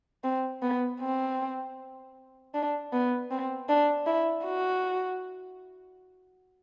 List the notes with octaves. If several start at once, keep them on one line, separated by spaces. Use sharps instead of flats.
C4
B3
C4
D4
B3
C4
D4
E4
F#4